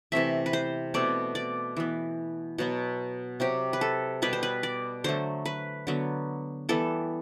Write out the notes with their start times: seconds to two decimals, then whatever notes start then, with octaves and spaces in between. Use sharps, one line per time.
0.12 C3 E3 A3 C4 E5
0.46 B4
0.53 C5
0.94 B2 A3 C4 D5
1.35 D5
1.77 E3 B3
2.58 B2 F#3 B3
3.40 C3 F#3 C4 G4
3.73 B4
3.81 A4
4.22 B2 G3 B3 B4
4.33 C5
4.43 B4
4.63 D5
5.04 D3 F#3 A3 C5
5.45 B4
5.87 D3 F#3 B3
6.69 E3 G3 B3 A4